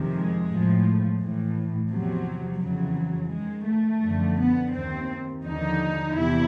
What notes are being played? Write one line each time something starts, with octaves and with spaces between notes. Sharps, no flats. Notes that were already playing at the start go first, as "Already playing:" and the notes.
Already playing: F2 C3 D#3
G#3
A2 F3
A2 E3
E2 C3 F3 F#3
F2 C#3 E3 F#3
G#2 D#3 G#3
A3
F#2 D3 F3
B3
D#2 D#3 C4
D#2 D3 F3 D#4
E2 C3 E3 E4